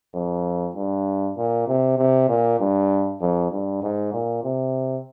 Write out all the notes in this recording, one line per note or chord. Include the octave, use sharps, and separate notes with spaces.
F2
G2
A#2
C3
C3
A#2
G2
F2
G2
G#2
A#2
C3